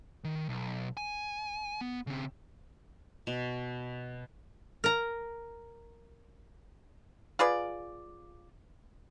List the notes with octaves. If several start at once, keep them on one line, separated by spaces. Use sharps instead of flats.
D#3
B1
G#5
B3
C#3 C4
B2
A#4 A#5
F4 G#4 B4 D5